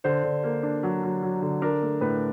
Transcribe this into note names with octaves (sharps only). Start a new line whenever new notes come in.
D3 C5
D3
A#3
D4
F#3
F#3
F#3
D3
D4 A#4
A3
A2 B4